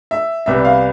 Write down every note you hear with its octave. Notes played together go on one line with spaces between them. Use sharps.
E5
C2 C3 G3 B3 E5
F5